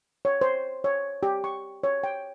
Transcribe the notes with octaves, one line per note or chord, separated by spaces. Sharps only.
C#5
C5
C#5
G4
C#6
C#5
G5